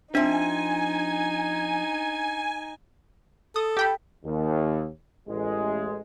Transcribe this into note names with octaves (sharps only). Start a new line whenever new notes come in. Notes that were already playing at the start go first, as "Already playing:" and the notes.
F3 C4 D4 D#4 E5 G#5
A4 D#6
G4 G5 B5
D#2
A1 G#3